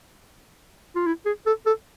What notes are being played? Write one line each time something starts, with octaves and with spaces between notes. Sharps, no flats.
F4
E4
G#4
A4
A4